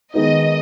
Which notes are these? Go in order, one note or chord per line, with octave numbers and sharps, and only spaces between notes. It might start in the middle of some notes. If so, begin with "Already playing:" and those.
D#3 G#3 B3 D#4 D#5